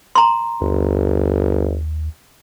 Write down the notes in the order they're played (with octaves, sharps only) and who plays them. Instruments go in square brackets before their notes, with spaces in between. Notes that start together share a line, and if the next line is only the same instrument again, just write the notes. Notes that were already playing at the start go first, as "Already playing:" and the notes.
[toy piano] A#5 C6
[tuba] G1 [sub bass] D#2